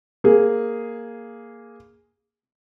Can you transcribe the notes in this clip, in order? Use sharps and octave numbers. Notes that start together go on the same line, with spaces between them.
A#3 G#4